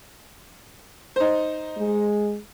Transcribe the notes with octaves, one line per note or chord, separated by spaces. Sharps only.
D#4 C5
G#3